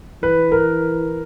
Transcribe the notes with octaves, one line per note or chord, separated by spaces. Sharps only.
E3 B4
A#4